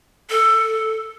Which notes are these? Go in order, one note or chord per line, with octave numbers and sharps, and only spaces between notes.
A4